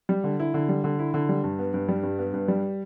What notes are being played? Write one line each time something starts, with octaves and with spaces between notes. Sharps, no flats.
G3
D3
E4
D3
G3
D3
E4
D3
G3
G2
B3
G2
G3
G2
B3
G2
G3